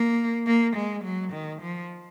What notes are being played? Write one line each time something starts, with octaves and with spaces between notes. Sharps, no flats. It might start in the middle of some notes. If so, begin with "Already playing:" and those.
Already playing: A#3
A#3
G#3
F#3
D#3
F3